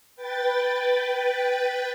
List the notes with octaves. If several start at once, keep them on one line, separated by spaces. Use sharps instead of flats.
B4 G5 A6